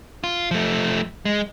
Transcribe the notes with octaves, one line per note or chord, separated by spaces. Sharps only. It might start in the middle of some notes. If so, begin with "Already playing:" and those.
F4
F3 A3
G#3